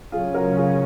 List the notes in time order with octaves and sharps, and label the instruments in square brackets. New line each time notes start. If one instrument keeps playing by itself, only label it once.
[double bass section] C#3 F#3 C#4 [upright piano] F4 G#4
[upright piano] F#4 A#4
F4 G#4